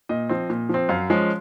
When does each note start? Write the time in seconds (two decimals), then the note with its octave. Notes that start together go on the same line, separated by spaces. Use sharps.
0.09 A#2 D#5
0.29 F3 C4
0.50 A#2
0.69 F3 C4
0.89 F#2 F5
1.10 F3 G#3 C#4